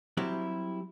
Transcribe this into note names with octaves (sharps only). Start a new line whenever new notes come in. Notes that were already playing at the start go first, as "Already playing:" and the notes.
F#3 G3 C4 E4 G4